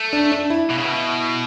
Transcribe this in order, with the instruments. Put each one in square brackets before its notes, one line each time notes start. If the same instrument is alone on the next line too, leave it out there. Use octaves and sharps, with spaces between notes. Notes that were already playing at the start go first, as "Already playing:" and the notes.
Already playing: [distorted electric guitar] A3
[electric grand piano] D4
D4
E4
[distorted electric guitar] B2
C#3
B2